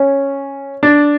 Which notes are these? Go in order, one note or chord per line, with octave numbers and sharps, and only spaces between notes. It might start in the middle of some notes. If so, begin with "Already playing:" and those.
Already playing: C#4
D4